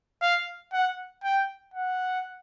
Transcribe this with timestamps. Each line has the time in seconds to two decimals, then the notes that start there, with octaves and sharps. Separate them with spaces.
0.22 F5
0.73 F#5
1.24 G5
1.74 F#5